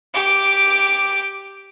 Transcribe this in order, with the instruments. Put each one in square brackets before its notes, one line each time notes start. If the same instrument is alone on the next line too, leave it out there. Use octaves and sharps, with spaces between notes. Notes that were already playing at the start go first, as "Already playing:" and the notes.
[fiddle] G4 D6